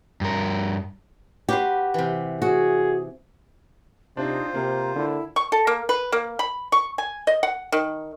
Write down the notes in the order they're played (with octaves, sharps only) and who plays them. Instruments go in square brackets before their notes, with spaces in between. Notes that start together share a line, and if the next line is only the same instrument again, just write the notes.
[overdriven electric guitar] G2 A#4
[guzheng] F#4 B4 C6 [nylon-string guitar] G4
[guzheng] C3 E3
[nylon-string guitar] F#4 [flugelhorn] G#4
[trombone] C3 [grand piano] C4 D4 [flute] D#4 [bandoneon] F4 C5
[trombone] C3 [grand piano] A#3 [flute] A#5
[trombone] D3 [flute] E4
[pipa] C#6
A4
A#3
B4
A#3
B5
C#6
G#5
D#5
F#5
D#3